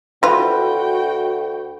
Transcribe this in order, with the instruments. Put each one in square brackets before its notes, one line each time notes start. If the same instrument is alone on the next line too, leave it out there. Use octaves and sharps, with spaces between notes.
[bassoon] D2 [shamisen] E3 F4 [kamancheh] F#4 G5 [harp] B4